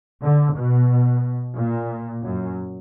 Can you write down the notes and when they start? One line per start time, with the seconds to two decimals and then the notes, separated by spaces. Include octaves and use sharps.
0.23 D3
0.56 B2
1.57 A#2
2.25 F#2